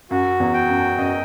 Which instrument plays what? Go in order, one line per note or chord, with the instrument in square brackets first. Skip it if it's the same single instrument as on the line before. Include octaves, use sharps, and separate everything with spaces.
[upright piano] F#2 [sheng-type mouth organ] F#4
[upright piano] E2
[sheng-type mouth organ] G5
[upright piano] F#2
[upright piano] F#2 [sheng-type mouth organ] D#5